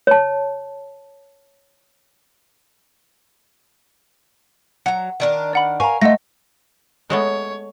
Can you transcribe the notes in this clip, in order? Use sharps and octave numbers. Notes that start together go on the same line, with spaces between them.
C#5 A5
F#3 F#5 A#5
D#3 D4 A#4
D5 F#5 B5
A#4 F5 G#5 A#5 C#6
A3 F4 D#5 F#5 A#6
G#3 A3 B3 C#5